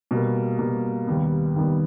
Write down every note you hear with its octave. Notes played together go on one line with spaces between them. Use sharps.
B2 G3 A#3
B2 G3 A#3
D#2 D#3 G3 B3
D#2 D#3 G3 B3